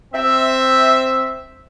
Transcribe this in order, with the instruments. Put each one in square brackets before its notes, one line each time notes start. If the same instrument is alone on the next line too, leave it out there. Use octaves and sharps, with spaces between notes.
[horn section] C4 E5